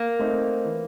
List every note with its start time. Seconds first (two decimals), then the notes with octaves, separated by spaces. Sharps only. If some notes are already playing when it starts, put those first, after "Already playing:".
Already playing: A#3
0.19 A3 C4 D#4
0.65 E3